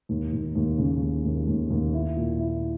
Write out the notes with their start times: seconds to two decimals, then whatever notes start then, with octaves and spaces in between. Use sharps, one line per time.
0.09 D#2
0.33 D#2
0.55 D#2
0.78 C#3
1.02 D#2
1.25 D#2
1.47 D#2
1.70 D#2
1.94 E4
2.17 A#2
2.39 E4